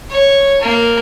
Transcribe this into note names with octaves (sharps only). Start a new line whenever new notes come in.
C#5
A#3